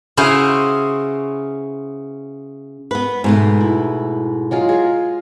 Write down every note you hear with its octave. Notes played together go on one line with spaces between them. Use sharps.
C#3 C#4 E4 F#4 C5
B3 B4
G#2 B2 A3
E4
F#3 G#3 F4
G#4 D#5